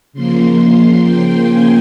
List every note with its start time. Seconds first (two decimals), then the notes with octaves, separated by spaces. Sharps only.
0.13 C#3 F3 A#3 C6
0.58 C6
1.03 G5
1.47 G#5